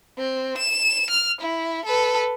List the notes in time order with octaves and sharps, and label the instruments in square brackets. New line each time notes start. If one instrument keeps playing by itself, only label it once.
[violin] C4
E7
F6
E4
A4 B4